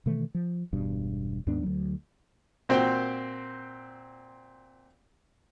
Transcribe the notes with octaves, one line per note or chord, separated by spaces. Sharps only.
B2 D#3 E3 A3
F3
E1 G2 B2
D#2 G#2 B3 D4
D2 F#3
A#2 C4 F#4 C5 G5